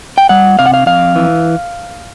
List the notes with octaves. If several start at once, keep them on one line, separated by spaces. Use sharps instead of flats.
G5
G3 F#5
C3 F5
F#5
F5
F2 F5
E3